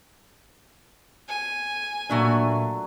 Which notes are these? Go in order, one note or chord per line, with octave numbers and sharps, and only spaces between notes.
G#5
A#2 F#3 A3 D4 E5